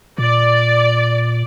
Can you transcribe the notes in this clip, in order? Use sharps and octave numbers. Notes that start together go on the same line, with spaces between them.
A#2 D5